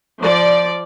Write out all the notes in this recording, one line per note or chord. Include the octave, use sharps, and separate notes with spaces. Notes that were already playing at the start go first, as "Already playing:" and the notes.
F3 D5